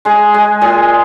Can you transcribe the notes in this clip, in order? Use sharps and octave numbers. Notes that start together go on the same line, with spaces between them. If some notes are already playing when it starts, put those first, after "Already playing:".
G#3 G#4
G#3
A#2 G#4